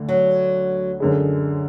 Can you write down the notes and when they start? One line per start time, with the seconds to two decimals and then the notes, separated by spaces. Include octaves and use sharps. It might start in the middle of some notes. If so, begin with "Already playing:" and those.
Already playing: D2 D3 D4
0.09 F#3
1.00 F#2 D3 G#3